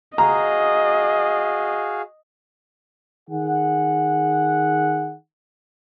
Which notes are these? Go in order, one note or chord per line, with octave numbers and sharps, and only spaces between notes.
F#4 G#4 D#5 F5 A#5
D#3 G#4 F#5